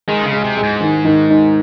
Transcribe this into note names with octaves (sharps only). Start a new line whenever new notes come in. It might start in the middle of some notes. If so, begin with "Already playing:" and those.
D#3 G#3
C#3
G#3
C3
G#3
G#2
D#3
D#3
D#4